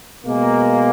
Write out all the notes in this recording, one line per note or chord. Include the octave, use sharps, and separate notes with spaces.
B2 G#3 A#3